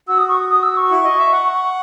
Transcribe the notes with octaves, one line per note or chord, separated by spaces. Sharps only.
F#4 E6
D#6
C#6
D#6
D#6
E6
C#6
E4
D#5
E5
F#5